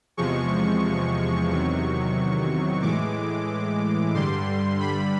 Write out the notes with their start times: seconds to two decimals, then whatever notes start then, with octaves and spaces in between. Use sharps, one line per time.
0.17 E2 C3 F3 G#3 C#6
1.49 E2 C3 D#3 F#3 C#6
2.82 A2 E3 G#3 D6
4.15 G2 D3 G3 C6
4.80 B5